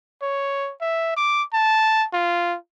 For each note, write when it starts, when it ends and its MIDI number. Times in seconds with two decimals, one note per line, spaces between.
0.22 0.72 73
0.81 1.14 76
1.17 1.43 86
1.54 2.06 81
2.13 2.57 65